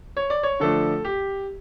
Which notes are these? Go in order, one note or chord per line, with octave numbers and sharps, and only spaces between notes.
C#5
D5
C#5
D3 F3 A3 D4 A4
G4